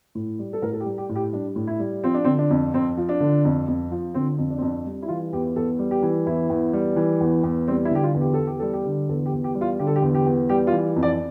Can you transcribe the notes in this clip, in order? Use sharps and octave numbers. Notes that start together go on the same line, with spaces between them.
A2
G3
A4
A2 A#4
A4
G4
G3
G4
A2
G4
G3 D4
A2
E4
G3
F3 C4
D4
D3 C4
D4
F2
F2 C4
F3
D4
D3
F2
F2
F3
D3 C4
F2
D4
C4
F2 D4
G3
E4
E3 F4
E2 G4
E2 A4
G3
G4
E3
E2 E4
E2
G3
E3
E2
E2
G3 C4
E4
D3 G4
F4
E2
G4
E2 A4
G4
G3 A4
G4
D3
E2 A4
G4
E2
G4
G3
F4
D3 G4
A4
G4
E2
G4
E2
G3 G4
F4
E3
F2
D5